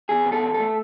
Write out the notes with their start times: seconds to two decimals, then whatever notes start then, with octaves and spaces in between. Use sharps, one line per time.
0.09 E2 G#4
0.26 B2
0.32 A4
0.43 E2
0.54 A4
0.60 A3